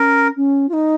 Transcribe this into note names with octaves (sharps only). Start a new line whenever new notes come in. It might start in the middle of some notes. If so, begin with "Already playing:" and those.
Already playing: C#4 A#4
C#4
F4
D#4